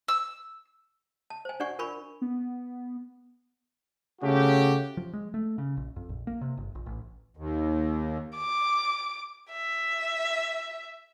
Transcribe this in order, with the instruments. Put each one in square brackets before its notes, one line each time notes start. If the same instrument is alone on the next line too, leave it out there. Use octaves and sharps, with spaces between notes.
[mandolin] E6
[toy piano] A5
C5 G#5
D4 F#4 D5 F#5 G#5 C#6
F4 A#4 G#5 B5 C#6
[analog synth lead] B3
[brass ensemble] C#3 A3 F#4 G4
[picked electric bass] F3
G#3
A3
C#3
A#1
F2
A#1
A#3
C3
G1
A#1
A1
[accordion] D#2
[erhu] D6
E5